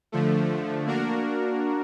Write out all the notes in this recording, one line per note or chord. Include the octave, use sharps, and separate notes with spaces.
D3 F3 A3
A#3 D4 F#4 A#4